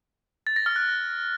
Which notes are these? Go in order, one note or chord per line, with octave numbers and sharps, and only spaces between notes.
A6
A#6
F6
F#6